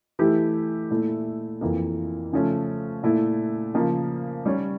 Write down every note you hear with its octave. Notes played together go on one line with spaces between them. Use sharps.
E3 A3 E4 G4
A#2 A3 E4
F2 E3 A#3
C#3 F3 A3 C#4
A#2 A3 E4
C#3 F3 A#3
G3 C#4 G4 C#5